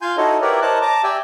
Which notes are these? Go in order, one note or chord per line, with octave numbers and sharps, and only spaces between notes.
F4 F5 G#5 C6 G6
D#4 E4 F#4 A4 C#5 D#5
E4 G4 A#4 B4 C#5 D5
A#4 C5 C#5 D#5 A5 F#6
A5 A#5 D6
G4 D5 E5 G5 G#5